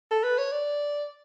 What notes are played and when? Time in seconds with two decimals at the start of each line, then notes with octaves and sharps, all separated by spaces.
0.11 A4
0.24 B4
0.38 C#5
0.52 D5